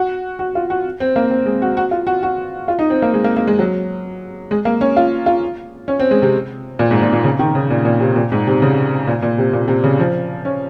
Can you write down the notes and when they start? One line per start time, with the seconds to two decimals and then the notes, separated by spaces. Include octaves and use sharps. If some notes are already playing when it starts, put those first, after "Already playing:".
Already playing: F#4
0.39 F#4
0.55 F4
0.70 F#4
1.00 C4
1.16 A#3
1.30 C4
1.46 G#3
1.62 F#4
1.77 F#4
1.91 F4
2.07 F#4
2.23 F#4
2.68 F4
2.79 D#4
2.90 C4
3.02 A#3
3.14 G#3
3.24 A#3
3.36 A#3
3.47 G#3
3.59 F#3
4.51 G#3
4.65 A#3
4.81 C#4
4.96 F4
5.26 F4
5.88 C#4
6.00 C4
6.11 G#3
6.22 C3
6.79 A#2
6.91 G#2
7.02 A#2
7.13 A#2
7.24 C#3
7.39 D#3
7.55 C#3
7.70 A#2
7.85 A#2
8.00 C3
8.16 A#2
8.32 G#2
8.47 C3
8.62 C#3
9.07 A#2
9.22 A#2
9.38 C3
9.53 A#2
9.68 C3
9.84 C#3
9.99 F3
10.45 C#4